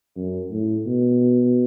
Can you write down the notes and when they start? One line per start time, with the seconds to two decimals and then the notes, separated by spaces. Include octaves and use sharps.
0.16 F#2
0.51 A2
0.86 B2